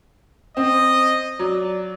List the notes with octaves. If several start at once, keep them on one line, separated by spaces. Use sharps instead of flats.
C4 D#5
F#3 D5